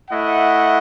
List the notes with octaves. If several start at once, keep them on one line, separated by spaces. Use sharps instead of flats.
A3 E4 D#5 F#5